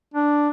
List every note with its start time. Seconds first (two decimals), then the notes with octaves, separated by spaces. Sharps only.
0.14 D4